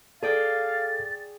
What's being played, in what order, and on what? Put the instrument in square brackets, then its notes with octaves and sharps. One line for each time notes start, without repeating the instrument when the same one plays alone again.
[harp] G#4 D5 G5 [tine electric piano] A4 [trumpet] F5 [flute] A6